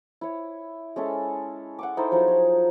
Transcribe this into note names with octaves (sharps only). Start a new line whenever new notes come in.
E4 C#5
G#3 C#4 A4 E5
F#5 C#6 D6
D#4 E4 A4 C5
F3 F#3 D#4 G#4
C#5